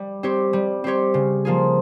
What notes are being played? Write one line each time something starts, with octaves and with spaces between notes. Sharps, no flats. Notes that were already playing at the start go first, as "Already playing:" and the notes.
Already playing: G3
C4 G4 C#5
G3
C4 G4 C#5
C#3
F3 A#3 F4 G#4